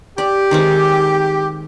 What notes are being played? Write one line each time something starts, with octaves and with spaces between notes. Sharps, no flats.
G4 D5
D#3 G#3 C4